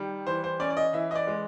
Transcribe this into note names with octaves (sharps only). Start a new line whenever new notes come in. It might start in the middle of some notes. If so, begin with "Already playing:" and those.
Already playing: D#3 G3
E3 C5
C5
C#4 D5
D5
D#5
E3 E5
D#5
D5
G#3